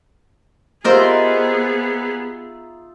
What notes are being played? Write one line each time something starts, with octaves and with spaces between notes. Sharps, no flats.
B3 D#4 F4 G4 G#4 A#4 C5 E5